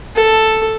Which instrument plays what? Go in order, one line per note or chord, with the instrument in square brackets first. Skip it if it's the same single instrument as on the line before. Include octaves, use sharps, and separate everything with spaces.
[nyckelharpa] A4